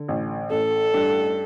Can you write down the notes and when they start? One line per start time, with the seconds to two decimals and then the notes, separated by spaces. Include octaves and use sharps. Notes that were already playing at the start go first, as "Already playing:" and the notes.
Already playing: D3
0.08 A1
0.51 A1 A4
0.94 G2